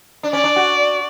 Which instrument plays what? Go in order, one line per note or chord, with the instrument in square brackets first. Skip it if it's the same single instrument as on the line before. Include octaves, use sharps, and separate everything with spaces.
[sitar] D4
[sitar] C#4 [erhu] D5
[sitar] D4
F#4